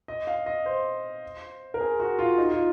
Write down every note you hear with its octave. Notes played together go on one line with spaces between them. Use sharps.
D#5
F5
D#5
C5
A#4
G#4
F#4
F4
D#4
F4